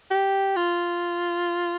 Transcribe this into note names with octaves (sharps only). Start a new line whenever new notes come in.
G4
F4